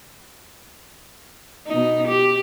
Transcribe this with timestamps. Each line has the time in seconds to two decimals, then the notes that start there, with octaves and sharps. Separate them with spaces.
1.67 B2 D#4
2.07 G4